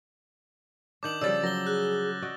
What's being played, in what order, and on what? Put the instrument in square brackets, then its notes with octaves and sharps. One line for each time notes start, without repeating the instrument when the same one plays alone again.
[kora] D#3 D4 [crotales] D6 G6 F#7
[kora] C#3 F3 G3 [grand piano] D5 [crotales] E6 A6
[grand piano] F#3 [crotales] A#6 G7
[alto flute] G#4 [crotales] F#6
[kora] F#4 D5 D#5